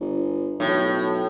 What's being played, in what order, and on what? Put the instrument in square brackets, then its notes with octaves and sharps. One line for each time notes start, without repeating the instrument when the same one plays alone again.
[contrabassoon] G1
[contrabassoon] B1 [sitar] A2